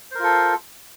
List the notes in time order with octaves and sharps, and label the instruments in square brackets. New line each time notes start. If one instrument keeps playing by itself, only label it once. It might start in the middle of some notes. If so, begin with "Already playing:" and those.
[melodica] C5
A#4
F4
A4